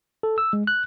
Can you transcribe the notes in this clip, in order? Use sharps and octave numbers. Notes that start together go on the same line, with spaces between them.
A4
E6
G#3
F#6